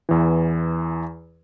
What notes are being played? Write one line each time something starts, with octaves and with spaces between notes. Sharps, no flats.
E2 E3